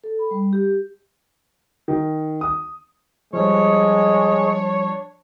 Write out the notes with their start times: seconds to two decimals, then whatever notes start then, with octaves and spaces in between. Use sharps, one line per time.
0.04 A4
0.19 B5
0.31 G3
0.53 G4
1.88 D#3
2.41 D#6
3.33 F3 G3 G#3 D4 C#5